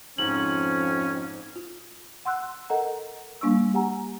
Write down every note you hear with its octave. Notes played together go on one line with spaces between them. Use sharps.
F2 G#2 C#4 F#7
F4
F#5 C6 E6 F#6
A4 A#4 D#5 F#5 A#5
G3 A#3 D4 C#6 E6
G4 F#5 G#5 A#5